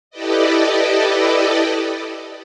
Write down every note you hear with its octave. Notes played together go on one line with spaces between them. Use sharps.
E4 G4 A4 B4 D5 D#5